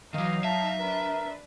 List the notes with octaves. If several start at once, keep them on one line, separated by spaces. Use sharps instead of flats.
D#3 E3 F#3 D#4 D#5 F5
E5 A5
D4 A#4 B4